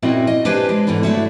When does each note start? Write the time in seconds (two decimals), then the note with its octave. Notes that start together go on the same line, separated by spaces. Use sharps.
0.02 A#2 C4 C#4 E4 F#4 D#5
0.27 D#5
0.45 D4 G4 B4 C5 G#5
0.69 G#3
0.87 G#2 B2 D3 E3
1.03 F#3 A3 A#3 D4 E4 F#4